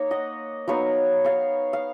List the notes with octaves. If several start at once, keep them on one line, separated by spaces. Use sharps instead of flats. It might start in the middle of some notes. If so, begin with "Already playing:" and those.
Already playing: A#3 D#4 C#5
D#5 F#5
F#3 B3 D#4 C#5 F5
C#5 F5
F5